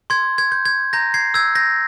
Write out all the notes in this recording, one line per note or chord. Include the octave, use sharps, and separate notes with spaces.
C6 G#6
G#6
G6
G#6
A#5 G6 A#6
G#6 C7
E6 G6 G#6
G6 A#6